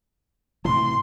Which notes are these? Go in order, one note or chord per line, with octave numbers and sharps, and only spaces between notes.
A2 C3 E3 C6